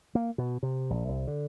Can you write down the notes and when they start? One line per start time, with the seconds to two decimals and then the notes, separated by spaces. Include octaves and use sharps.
0.15 A#3
0.38 B2
0.63 C3
0.90 A#1
1.09 C2
1.27 D3